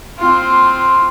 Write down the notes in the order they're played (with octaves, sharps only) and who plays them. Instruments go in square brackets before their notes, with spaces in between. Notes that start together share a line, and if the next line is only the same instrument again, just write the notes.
[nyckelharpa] C4 F4